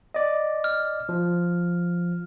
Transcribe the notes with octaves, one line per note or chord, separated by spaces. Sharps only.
D5 D#5
F6
F3